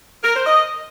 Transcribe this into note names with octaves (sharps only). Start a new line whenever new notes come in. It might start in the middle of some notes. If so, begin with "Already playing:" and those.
A#4
C5
D#5